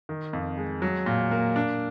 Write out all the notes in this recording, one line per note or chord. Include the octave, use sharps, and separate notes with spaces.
D#3
F2
G#3
F#3
A#2
A#3
D4